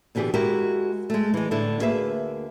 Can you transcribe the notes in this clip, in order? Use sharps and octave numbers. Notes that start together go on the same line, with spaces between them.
B2 D3 E3 G4 G#4
G#3 E4 F#4 G4 A#4
G#3 A3
E3 G#3
A2 D3 D4 E4
D2 A#3 G#4 B4 E5